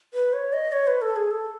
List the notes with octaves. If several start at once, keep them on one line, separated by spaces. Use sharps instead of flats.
B4
C#5
D#5
C#5
B4
A4
G#4
A4